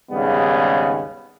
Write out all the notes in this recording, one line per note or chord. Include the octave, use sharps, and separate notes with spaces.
G#1 D#2 C#3 G3 B3